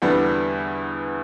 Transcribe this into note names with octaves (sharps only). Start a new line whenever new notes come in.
E2 D3 G3 B3 D4